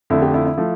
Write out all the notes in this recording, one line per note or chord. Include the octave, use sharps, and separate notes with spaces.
F2 D3 A3 E4
G4
E4
E4
F3 A3